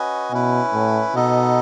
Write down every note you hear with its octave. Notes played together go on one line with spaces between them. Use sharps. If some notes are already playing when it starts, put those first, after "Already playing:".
Already playing: C#4 F#4 B4 D#5 G#5
B2 C#4 E4 B4
A2
B2 B3 D#4 A4 D#5